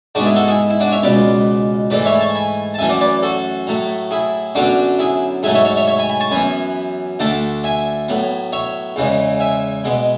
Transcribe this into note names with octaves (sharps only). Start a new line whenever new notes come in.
G#2 G#3 B3 D4 F#4
E4 G#4
F#4 A4
E4 G#4
E4
D4 F#4
C#5 E5
C#2 B2 G#3 B4 D5
G#2 E3 A3 B4 D5
C#5 E5
B5
A5 C#6
G#5 B5
A5
F#2 E3 A3 E5 G#5
D5 F#5
B4 D5
F#4 A4
A2 F#3 A3
E4 G#4
F#2 D3 F#3 B3 D4 F#4
E4 G#4
G#2 F#3 A3 E5 G#5
C#5 E5
C#5 E5
C#5 E5
C#5 E5
G#5 B5
G#5 B5
A5 C#6
F#2 E3 B3 G#5 B5
D2 D3 A3 F#5 A5
E5 G#5
A2 F#3 B3
C#5 E5
E2 C#3 E3 G#3
E5 G#5
B2 G#3 B3